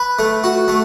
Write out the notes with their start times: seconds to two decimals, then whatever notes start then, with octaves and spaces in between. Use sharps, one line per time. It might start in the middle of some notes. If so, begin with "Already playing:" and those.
Already playing: B4
0.19 A3
0.44 F#4
0.68 A3